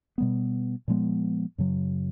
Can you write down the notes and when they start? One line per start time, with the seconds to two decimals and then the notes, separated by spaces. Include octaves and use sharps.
0.18 B2 G3 B3
0.88 A#2 F3 G#3 B3
1.58 F#2 C#3 F#3